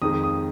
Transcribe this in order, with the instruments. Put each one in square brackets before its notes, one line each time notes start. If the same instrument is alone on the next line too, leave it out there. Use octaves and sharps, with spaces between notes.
[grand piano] F2 D#3 G#3 D#6
D#6